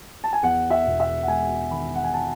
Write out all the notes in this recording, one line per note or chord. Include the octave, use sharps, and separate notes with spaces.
A5
G#5
E2 F#5
E5
E1
E5
F#5
G#3 G#5
D#3 B5
F#5
G#5
A5